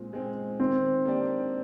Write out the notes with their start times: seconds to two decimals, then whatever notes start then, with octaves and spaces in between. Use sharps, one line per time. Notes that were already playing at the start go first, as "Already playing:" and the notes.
Already playing: A#2 G#3 C4
0.13 G#3 C4
0.59 D#3 C4
1.06 A#3 D4 G4 D5